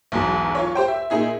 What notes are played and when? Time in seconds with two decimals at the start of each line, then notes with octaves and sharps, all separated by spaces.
0.12 B1 E2 G#2 F#3
0.55 F4 C#5
0.75 G4 C5 G5
0.88 E5
1.10 A#2 D#4 G#4 E5